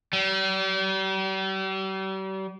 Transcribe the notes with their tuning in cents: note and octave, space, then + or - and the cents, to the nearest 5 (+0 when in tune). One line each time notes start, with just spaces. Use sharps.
G3 -40